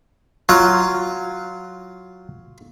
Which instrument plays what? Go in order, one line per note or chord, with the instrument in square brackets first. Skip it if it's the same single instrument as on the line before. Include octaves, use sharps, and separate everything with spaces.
[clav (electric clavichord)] F#3 [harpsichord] F4 F5